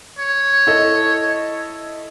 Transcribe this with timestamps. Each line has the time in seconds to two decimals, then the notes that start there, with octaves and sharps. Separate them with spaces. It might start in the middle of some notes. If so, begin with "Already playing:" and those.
0.19 C#5
0.67 E4 A4 D#5